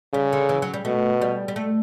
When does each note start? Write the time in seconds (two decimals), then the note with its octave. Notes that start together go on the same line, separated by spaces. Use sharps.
0.14 C#3 G3
0.33 D3
0.49 E3
0.62 F#3
0.74 G3
0.85 B2 A3
1.22 G3
1.48 G3
1.56 A3